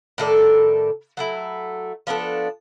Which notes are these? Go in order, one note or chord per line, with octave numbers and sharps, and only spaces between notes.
A2 D#3 A4 D5
F#3 A3 E4
F3 B3 D4 A4